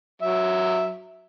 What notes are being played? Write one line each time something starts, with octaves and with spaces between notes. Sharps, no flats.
F#3 E5